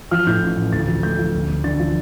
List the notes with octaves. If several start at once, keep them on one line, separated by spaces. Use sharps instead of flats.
F3 F6
A2 G6
A1
A1
D2 A6
F3
A3 G6
F3
D2
D2
D3 A6
F3